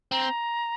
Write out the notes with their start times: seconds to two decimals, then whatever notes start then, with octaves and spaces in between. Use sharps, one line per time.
0.12 C4 A#5